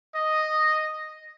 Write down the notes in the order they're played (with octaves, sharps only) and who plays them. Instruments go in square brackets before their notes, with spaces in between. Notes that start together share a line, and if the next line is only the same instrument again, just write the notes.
[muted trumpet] D#5